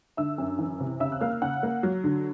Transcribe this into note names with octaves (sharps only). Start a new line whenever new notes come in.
D3 E5 E6
F#2
E3
C3
C#3 E5 E6
F#6
A#3 F5 F6
C#3 F#5 F#6
A#3
F#3
D3